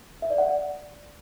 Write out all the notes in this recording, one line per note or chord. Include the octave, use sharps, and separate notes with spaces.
E5
D5
F#5
D5